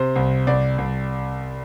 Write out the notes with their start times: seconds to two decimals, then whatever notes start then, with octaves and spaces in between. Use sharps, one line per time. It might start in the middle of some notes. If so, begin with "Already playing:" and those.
Already playing: C3 C5
0.16 C2
0.47 C2 D5
0.78 C2